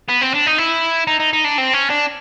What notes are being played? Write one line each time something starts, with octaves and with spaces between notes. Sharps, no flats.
B3
C4
D4
D#4
E4
D#4
D#4
D#4
D4
C4
C#4
D4